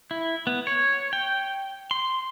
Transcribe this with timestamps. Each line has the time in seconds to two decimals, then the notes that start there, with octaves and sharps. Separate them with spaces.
0.11 E4
0.47 B3
0.67 C#5
1.13 G5
1.91 C6